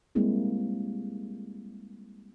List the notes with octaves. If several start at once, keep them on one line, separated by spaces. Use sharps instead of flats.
G3 G#3 A#3 C4 E4